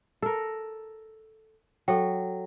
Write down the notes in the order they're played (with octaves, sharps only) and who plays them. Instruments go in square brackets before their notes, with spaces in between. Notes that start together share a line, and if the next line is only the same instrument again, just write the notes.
[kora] A4 A#4
[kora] F#3 [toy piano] A4 G5